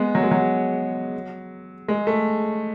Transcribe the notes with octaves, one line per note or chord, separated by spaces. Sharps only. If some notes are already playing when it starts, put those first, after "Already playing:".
Already playing: G#3 B3
F#3
G#3
F#3
G#3
A3